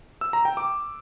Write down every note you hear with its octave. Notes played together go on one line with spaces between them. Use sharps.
E6
A#5
G5
D6